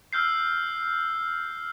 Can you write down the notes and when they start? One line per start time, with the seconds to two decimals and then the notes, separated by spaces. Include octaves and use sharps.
0.13 E6 F6 G6 C7